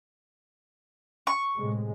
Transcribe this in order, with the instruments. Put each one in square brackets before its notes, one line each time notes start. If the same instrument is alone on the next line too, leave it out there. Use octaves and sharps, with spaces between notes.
[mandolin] C#6
[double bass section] A2 C3 G#3